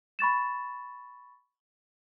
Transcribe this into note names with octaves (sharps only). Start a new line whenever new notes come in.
B5 C#6 A6 E7